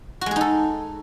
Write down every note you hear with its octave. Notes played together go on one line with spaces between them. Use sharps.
G#3 D#4 F#4 G#4 A4